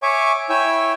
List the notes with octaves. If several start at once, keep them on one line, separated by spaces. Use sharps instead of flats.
C#5 E5 G#5 C#6 D6
E4 C#5 G5 G#5 E6